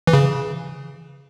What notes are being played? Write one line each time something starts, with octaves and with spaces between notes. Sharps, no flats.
E3
C#3